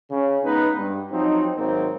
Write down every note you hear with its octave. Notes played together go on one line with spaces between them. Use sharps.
C#3
G#3 B3 D#4 B4
G2
F3 F#3 C4 D#4
G#1 F#3 A#3 C4 D#4